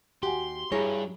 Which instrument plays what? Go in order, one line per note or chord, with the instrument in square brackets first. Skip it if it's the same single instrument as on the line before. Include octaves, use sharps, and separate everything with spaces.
[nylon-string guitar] D#2 G4 [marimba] F#4 F#5 G#5 [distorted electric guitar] C6
[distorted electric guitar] G2 [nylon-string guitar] E4 G#4 C#5 [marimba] G4 A#5 A#6